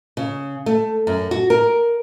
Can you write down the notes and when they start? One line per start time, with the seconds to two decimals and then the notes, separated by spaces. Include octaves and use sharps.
0.17 C#3
0.66 A3
1.07 F#2
1.31 F#4
1.50 A#4